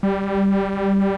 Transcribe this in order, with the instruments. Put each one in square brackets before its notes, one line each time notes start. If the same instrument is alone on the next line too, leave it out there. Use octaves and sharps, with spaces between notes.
[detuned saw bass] G3